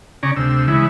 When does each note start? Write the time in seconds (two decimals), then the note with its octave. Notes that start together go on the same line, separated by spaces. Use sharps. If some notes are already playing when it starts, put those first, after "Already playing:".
0.23 C#3 C#4 D5 A#5
0.36 D2 C3 E6
0.68 C#3 E3 G#3 E4